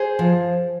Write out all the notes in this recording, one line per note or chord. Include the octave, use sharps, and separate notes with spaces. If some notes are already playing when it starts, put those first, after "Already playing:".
Already playing: G#4 C5
F3